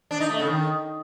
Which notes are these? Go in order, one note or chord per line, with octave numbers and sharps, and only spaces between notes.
D4
D#4
A3
C#3
D#3